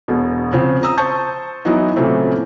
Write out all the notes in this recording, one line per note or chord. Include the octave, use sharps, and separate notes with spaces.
E1 B2
C#3 F3 C4
A#5 D#6 E6
C5 A5 C#6 G6
E3 F#3 B3 D#4
A#2 C#3 E3 F#3 A3 C4